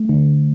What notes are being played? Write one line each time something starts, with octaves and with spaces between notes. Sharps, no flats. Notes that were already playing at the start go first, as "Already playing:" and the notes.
Already playing: A3
D3